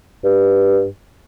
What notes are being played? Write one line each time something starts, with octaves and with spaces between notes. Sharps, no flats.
G2